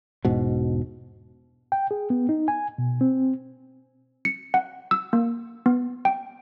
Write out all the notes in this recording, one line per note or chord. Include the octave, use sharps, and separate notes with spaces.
E1 G#2 B2
G5
G#4
B3
D#4
G#5
B2
C4
C#7
F#5
E6
A#3
B3
G5